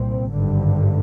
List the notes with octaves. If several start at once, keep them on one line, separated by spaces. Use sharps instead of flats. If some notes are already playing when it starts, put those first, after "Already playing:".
Already playing: C2 A#2 G3 C4
G#1 G2 D3 G3